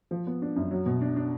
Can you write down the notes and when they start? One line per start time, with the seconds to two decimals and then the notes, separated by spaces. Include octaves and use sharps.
0.11 F3
0.27 B3
0.42 D4
0.56 F#2
0.71 F#3
0.86 B2
1.01 D4
1.16 D4